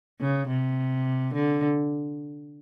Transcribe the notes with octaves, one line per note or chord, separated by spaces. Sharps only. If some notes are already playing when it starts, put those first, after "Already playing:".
C#3
C3
D3